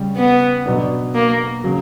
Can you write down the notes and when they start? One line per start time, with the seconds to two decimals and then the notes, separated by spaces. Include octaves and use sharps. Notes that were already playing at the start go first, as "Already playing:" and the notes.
Already playing: C#3 G3 C#4
0.17 B3
0.66 B2 F#3 B3 D4
1.15 A#3
1.64 C#3 F#3